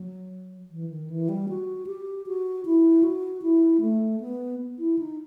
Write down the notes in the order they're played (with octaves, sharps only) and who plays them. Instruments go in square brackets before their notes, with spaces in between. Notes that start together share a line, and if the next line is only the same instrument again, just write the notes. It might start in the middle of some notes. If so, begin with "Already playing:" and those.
Already playing: [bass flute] F#3
E3
D#3
E3
G3
F#4
G4
F#4
E4
F#4
E4
A3
B3
E4
D#4